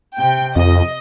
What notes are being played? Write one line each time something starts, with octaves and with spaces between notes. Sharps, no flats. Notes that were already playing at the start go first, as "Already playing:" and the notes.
C3 G5
F2 D#5